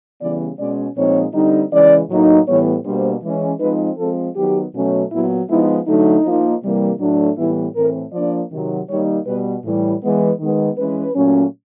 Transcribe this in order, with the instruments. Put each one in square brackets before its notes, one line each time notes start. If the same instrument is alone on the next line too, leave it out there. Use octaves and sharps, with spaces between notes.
[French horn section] C#3 E3 G3 B3 D5
B2 G#3 C#4 D5
A#2 F3 G#3 C4 D#4 C#5
D3 G3 C4 D#4
C#3 E3 G#3 C#4 D5
A2 F#3 A#3 D#4
A2 E3 G3 B3 C#5
B2 G3 A#3 D4 C5
E3 G#3 C#4
F3 G#3 C4 D#4 B4
F3 G#3 C4 A4
D#3 F#3 B3 G4
B2 F#3 A3 C#4
A#2 F#3 B3 E4
F3 G#3 B3 D#4 E4
D3 F#3 A3 D#4
F3 A#3 D#4
C3 E3 G3 A#3
A2 F#3 A3 D4
A2 E3 G3 B3 E4
A2 E3 A3 C4 A#4
F3 A#3 D4 D5
C3 D#3 F#3
D#3 G3 A#3 D#4 C#5
B2 G3 B3 B4
A2 E3 G3
E3 G#3 B3
D#3 G#3 B3
E3 G#3 C#4 B4
A#2 F#3 A3 C#4